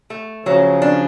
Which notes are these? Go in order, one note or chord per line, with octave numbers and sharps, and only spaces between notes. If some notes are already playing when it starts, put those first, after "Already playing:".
A3
C#3 F3 F#3
D4